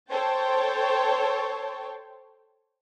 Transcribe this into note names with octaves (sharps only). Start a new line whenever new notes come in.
A4 C5 C#5 G5 A5